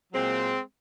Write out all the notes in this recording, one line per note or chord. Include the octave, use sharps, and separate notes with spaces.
A#2 F#3 G#3 C4